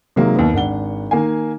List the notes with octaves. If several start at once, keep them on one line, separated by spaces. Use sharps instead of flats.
C3 D#3 F#3 G#3 A#3
D#2 B3
G#1 D4 F#5 G7
D#3 A#3 F5 G#5